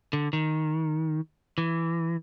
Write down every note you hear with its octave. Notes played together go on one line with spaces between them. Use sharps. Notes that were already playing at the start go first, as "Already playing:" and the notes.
D3
D#3
E3